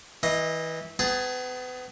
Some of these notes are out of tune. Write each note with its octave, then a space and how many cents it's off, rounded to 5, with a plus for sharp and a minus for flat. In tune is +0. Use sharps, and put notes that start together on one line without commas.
E3 -20 D#5 +0
B3 +35 G#4 -5 A5 +0